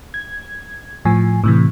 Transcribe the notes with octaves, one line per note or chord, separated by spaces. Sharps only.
G#6
A2 F3 G#5
A2 C3 E3